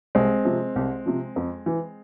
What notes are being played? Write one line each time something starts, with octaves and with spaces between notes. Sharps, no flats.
C2 G#3 C4
C3 F3
C2
C3 F3
F2
E3